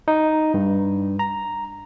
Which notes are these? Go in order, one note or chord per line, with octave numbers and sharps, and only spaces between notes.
D#4
G2
A#5